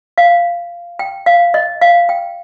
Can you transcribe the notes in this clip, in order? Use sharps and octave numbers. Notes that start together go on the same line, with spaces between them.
F5
G5
F5
D#5
F5
G5